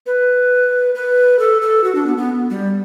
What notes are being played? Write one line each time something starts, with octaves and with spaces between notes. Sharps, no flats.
B4
B4
A4
A4
F#4
D4
B3
B3
G3